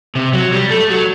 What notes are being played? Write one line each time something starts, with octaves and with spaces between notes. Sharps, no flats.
C3
F#3
G3
A3
F#3